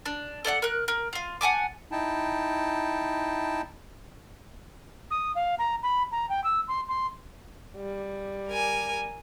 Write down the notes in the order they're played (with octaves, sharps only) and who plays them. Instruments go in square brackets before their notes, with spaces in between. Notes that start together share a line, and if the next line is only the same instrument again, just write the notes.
[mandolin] D4
A4 D5 F5 F#5
A#4 F#6
A#4
F4 F5
F#5 G#5 A5 D6
[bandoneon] D#4 E4 G5 A5
[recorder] D#6
F5
A#5
B5
A#5
G5
E6
C6
C6
[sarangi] G3
[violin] A#4 G#5